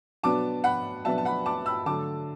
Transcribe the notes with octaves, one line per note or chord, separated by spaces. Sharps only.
B2 F#3 B3 D4 A5 D6
F#5 B5
B2 F#3 B3 D4 E5 A5
A5
F#5 B5
A5 D6
B5 E6
D3 F#3 A3 A5 D6